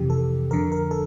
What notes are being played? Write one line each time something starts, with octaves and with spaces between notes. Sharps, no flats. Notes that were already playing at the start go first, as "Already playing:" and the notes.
Already playing: F2 C3 E3 G4
A4
F2 D3 A#4
A#4
A4